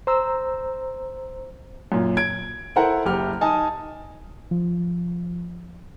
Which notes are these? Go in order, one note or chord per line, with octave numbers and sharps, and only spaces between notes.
C5 A#5 E6
F#2 A#2
G#6 D7
E4 A4 A#4 C5 F#5
F#1 G4 F6
D#4 G#5 A5 D#6
F3